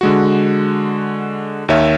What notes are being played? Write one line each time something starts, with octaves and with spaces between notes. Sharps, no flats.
D3 G#3 F#4
D#2 D#3 C#5 E5